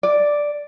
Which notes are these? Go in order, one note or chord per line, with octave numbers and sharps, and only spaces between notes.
D5